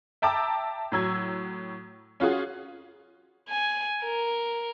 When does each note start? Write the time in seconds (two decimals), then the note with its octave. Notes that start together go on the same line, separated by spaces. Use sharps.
0.22 E5 G5 A5 A#5 D6 E6
0.92 A2 F#3 E6 G#6
2.20 C#4 F4 F#4 G#4
3.49 G#5
4.02 A#4